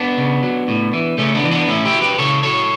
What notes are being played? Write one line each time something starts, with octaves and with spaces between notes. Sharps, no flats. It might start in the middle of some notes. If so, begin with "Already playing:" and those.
Already playing: B3 D4
C#3
F#3
A2
E3
C#3 A3 C#4
B3 D4
E3
B3 D4
A2 C#4 E4
E4 G4
F#3
G4 B4
C#3 A4 C#5
F#3 A4 C#5